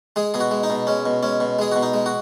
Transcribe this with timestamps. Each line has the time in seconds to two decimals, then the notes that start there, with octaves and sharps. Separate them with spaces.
0.16 G#3 G#4
0.34 B2 G#4
0.40 F#4
0.51 G#3
0.63 D#4
0.70 B2
0.87 G#3 C#4
1.06 B2
1.23 G#3 C#4
1.40 B2
1.59 G#3 G#4
1.72 B2 F#4
1.83 D#4
1.94 G#3
2.06 F#4